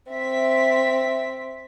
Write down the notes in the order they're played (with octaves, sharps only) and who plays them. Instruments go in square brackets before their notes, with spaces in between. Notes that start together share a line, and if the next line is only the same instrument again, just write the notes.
[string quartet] C4 [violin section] E5 B6